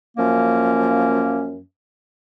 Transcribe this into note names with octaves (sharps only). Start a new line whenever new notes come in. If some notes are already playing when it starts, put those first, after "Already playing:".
F#2 F3 A#3 C#4